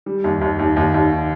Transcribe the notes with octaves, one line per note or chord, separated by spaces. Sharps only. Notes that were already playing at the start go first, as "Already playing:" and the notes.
G3
D#2
D#2
D#2
D#2
D#2